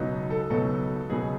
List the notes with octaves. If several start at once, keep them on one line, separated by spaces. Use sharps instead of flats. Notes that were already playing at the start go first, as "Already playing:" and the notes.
Already playing: C#2 B2 F#3 B3 D#4
A4
C#2 B2 F#3 B3 D#4 A4
C#2 B2 F#3 B3 D#4 G#4